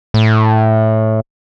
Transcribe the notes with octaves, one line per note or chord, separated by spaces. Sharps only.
A2